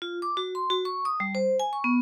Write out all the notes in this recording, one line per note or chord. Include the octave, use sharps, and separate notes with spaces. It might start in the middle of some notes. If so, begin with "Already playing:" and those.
F4
D6
F#4
C6
F#4
C#6
D#6
G3
C5
G#5
C#6
B3